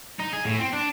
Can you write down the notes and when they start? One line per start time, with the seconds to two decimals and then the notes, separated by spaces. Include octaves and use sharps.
0.19 D#4
0.33 G#4
0.45 A2
0.59 C4
0.73 D4